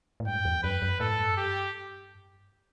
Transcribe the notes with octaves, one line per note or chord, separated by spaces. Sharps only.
A2
G2 G5
E2
F#2 B4
F#2
A2 A4
G2
F#2
G2 G4